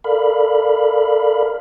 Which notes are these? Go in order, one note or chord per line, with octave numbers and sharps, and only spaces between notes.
A4 A#4 D5 F5 B5